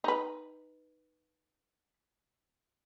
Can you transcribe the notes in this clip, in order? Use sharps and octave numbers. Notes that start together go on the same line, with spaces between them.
D#4 B4